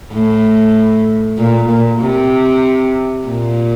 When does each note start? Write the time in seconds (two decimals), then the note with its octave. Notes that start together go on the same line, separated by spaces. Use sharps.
0.13 A2
1.38 A#2
1.69 A#2
2.01 C3
3.27 A#2